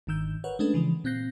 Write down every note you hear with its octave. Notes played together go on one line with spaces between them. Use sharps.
G1 G#2 D#3 E6 G6
A#4 B4 C#5 F#5
G#3 A3 C#4 D4 A4 B4
C#3 E3 F3 G#3
A#2 C4 F#6 G6 A#6 C7